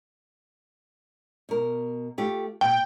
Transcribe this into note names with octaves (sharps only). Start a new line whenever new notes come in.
B2 A#4
A3 F4 G4
A#2 G5